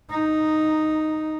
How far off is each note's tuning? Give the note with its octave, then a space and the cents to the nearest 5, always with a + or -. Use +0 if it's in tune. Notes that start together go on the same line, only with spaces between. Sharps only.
D#4 -5